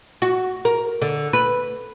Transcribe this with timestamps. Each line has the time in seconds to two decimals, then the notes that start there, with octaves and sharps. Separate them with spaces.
0.22 F#4
0.65 A#4
1.02 D3
1.33 B4